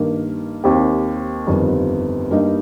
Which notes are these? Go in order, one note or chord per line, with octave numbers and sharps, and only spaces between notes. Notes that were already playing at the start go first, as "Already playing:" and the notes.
Already playing: G2 D#3 A#3
D#2 D#3 C4 G4
G1 F2 D#3 G3
G2 G3 A#3 D#4